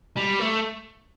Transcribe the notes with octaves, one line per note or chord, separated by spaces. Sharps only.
G3
A3